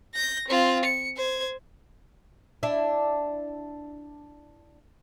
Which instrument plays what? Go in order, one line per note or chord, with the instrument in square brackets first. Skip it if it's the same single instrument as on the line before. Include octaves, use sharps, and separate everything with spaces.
[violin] G6 A#6
C4 F4
C#7
C5 G#6
[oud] D4 E4